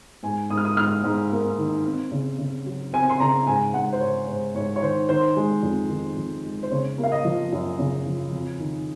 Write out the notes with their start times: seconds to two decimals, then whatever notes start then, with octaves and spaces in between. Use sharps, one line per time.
0.23 G#2 G#5
0.50 G#2 D#6
0.57 F6
0.65 D#6
0.77 G#2 F6
1.04 G#2
1.32 A#3
1.58 D#3
1.86 C4
2.12 C#3
2.39 C#3
2.66 F#3
2.93 C4 G#5
3.10 C6
3.20 C#3 A#5
3.47 G#2 G#5
3.74 G#2 F#5
3.93 C5
4.01 G#2 C#5
4.28 G#2 C5
4.55 G#2 C#5
4.76 C#5
4.82 D#3 C5
5.09 D#3 C5
5.37 G#3
5.63 F2
5.90 D#3
6.16 F2
6.45 G#3
6.63 C5
6.71 C#3 C#5
6.98 A#3
7.03 F5
7.12 D#5
7.25 F3
7.53 F#2
7.79 C#3
8.06 F3
8.32 F2
8.59 D#3